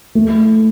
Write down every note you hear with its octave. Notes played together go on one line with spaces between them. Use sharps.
A3